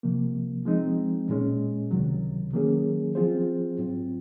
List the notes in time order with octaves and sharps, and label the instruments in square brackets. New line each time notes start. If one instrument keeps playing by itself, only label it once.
[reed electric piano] C2 C3 F3 A#3
F3 G#3 C4 D#4
A#2 G#3 C#4
C#2 C3 D#3 F#3
D#3 F#3 A#3 C#4 G#4
F3 C4 F4 G#4 C5
G#2 F#3 C4 F4